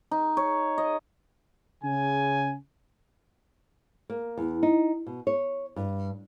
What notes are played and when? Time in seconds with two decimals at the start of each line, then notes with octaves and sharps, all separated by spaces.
0.11 D#4
0.37 C#5
0.78 D#5
1.84 C#3 G#5
4.10 A#3
4.37 E2
4.63 D#4
5.07 B2
5.27 C#5
5.76 G2